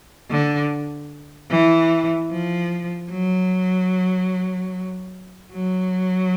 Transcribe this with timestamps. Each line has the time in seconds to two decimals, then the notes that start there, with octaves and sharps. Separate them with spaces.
0.31 D3
1.51 E3
2.31 F3
3.11 F#3
5.53 F#3